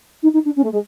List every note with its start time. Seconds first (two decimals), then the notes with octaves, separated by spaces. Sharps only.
0.23 D#4
0.33 D#4
0.45 D4
0.56 C#4
0.63 A3
0.72 G#3